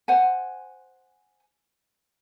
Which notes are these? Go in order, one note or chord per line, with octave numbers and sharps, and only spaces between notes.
C5 F#5 G#5